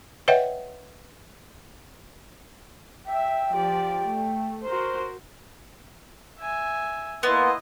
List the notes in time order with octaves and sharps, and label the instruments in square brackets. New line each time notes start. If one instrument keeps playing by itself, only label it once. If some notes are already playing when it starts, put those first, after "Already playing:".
[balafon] B4 C#5 D#5 E5 F#5 G5
[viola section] E5 [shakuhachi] G5
[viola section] F3 G4 D5
A3
F#4 A#4 C5
[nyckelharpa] E5 G#5
[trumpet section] A#3 G#5 C6 [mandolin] B3 [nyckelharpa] E4 D#5